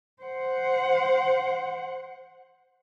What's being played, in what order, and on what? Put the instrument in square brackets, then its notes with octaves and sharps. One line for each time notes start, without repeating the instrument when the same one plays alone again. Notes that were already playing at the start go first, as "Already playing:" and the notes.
[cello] C5 F#5